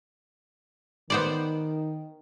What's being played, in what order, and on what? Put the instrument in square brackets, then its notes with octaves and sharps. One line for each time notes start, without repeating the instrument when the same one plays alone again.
[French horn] D#3 [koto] B3 C5 D5